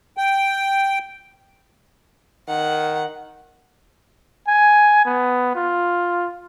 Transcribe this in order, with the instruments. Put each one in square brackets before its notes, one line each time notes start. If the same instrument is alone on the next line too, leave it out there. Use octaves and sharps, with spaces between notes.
[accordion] G5
[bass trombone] D#3 [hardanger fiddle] F#5
[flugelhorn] G#5
B3
F4